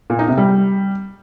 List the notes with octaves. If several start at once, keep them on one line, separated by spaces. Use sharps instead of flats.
A#2
D#4
C3
G3